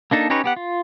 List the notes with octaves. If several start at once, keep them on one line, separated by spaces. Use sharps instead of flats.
A#3 D4 D#4 A4
C#4 D#4 G4 B4 C#5
B3 G4 F#5
F4